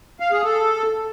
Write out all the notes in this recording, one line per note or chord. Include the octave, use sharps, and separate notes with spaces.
F5
G#4
A4